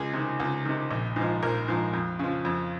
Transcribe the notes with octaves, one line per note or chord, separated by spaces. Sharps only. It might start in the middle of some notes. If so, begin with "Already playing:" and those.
Already playing: C#2 G#4
C3 D#3
C#2
C3 D#3
A#1
G#2
F3
A#1 A#4
G#2 F3
F2
C#3 F3
F2